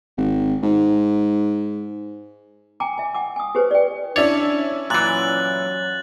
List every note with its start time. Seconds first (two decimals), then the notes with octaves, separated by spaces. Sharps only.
0.17 G#1
0.63 G#2
2.80 G5 G#5 A#5 D6
2.98 E5 G#5
3.14 F#5 G#5 D6
3.36 G#5 D#6
3.55 G4 G#4 B4 C5
3.71 D5 G5
4.16 C#4 D4 E4 C#5 D5
4.90 A#2 E3 F#3 F#6 A6 F#7